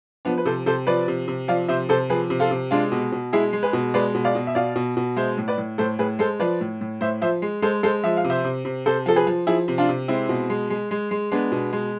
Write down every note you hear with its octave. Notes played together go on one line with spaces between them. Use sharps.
F3 B3 D4
B4
C3 A4 C5
C3 A4 C5
F3 B4 D5
C3
C3
F3 D5 F5
C3 C5 E5
C3 A4 C5
F3 G#4 B4
C3
F4 A4
C3
G#3 D4 F4
B2
B2
G#3 E4 G#4
G#3
G#4 B4
B2
G#3 B4 D5
B2
D5 F5
B2
E5
B2 D5 F5
B2
B2
G#3 C5 E5
A2
B4 D5
A2
A2 A4 C5
A2 G#4 B4
G#3 A4 C5
F3 B4 D5
A2
A2
A2 C5 E5
F3 C5 E5
G#3
G#3 A4 C5
G#3 A4 C5
F3 E5
F5
C3
C5 E5
C3
C3
C3 A4 C5
F3 A4
G#4 B4
F3
F3 E4 G#4
C3
D4 F4
C3
G#3 C4 E4
B2
G#3
G#3
G#3
G#3
G#3 B3 D4
B2
G#3